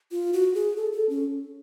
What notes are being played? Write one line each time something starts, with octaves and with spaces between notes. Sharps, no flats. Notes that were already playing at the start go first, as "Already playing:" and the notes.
F4
F#4
G#4
A4
A4
C#4